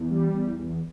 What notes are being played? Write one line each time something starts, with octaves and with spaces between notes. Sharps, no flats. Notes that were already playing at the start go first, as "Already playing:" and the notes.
Already playing: E2
G3
E2
E2